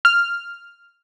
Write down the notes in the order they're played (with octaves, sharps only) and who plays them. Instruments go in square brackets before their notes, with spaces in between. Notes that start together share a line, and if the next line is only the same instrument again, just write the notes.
[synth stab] F6